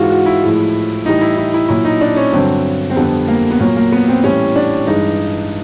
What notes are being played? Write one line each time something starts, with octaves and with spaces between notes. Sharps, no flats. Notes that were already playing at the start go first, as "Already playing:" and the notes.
Already playing: G#2 E3 G#3 F4 F#4
F#4
E4
A2 F3 G#3
A2 E3 G3 D#4
E4
E4
E4
A#2 F#3 E4
D#4
D4
C#4
G2 D3 F#3 C4
C4
F2 D3 G3 B3
A#3
B3
A#2 F#3 A#3
A#3
B3
C4
A2 E3 G3 C#4
D4
G2 E3 G#3 D#4